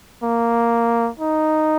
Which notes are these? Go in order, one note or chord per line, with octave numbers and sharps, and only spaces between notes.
A#3
D#4